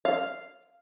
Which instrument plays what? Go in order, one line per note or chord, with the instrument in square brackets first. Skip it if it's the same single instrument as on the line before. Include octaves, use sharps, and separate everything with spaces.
[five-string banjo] F5